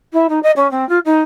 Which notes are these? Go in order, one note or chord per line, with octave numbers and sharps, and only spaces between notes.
E4
D#4
D#5
C#4
C4
F4
D#4